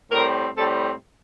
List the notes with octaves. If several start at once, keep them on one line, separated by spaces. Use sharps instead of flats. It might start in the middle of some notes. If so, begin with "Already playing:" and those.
A2 G3 C4 A#4
A2 G3 C4 A4